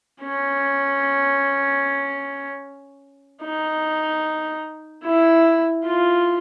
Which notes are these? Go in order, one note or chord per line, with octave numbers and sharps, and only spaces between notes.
C#4
D#4
E4
F4